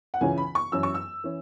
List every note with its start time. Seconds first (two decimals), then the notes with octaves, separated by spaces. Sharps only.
0.14 F#5
0.21 C#2 C#3 E3 C#4 G#5
0.38 B5
0.55 C#6
0.72 F#2 E3 C#4 E6
0.83 C#6
0.94 E6
1.24 E3 C#4